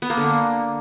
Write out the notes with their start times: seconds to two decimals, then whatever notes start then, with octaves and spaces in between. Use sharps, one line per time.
0.02 B3
0.10 A#3
0.18 D3